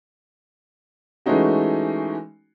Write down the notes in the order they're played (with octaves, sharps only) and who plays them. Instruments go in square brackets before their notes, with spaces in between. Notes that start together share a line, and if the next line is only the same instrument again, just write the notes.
[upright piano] E3 G#3 A3 C#4 D#4 F#4